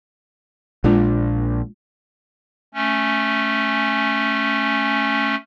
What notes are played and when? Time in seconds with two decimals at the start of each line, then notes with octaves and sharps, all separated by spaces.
0.84 A#1 A#2 G#3 D4 F4
2.74 A3 C#4